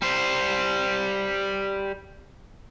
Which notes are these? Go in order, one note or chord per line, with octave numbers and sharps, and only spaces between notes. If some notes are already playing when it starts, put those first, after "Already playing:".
G3 C5